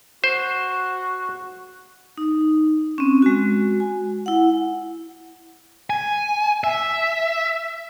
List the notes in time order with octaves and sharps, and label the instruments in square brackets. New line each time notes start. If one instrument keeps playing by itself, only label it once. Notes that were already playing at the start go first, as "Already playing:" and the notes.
[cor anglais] F#4 [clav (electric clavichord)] C5
[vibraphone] D#4
C4 C#4
G#3 F#4
G#5
E4 F#5
[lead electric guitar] G#5
E5